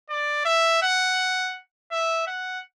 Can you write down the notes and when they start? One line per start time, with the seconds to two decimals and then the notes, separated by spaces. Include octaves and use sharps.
0.10 D5
0.45 E5
0.83 F#5
1.92 E5
2.27 F#5